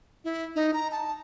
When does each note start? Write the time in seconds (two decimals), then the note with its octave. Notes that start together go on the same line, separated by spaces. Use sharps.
0.24 E4
0.56 D#4
0.74 A#5
0.92 A5